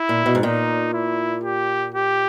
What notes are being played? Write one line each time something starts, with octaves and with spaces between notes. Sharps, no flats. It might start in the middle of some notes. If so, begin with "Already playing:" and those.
Already playing: E4
A#2
B2
G#2
A#2 D#4
E4
G4
G4